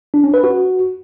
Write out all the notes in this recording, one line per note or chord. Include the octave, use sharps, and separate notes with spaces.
D4
C#4
B4
F#4